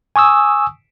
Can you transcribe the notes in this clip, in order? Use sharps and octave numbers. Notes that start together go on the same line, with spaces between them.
G#5 C#6 D#6 E6